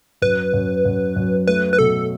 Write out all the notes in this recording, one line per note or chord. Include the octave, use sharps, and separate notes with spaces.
F#2 B4
F#2
F#2
F#2
A3 B4
B4
B2 A4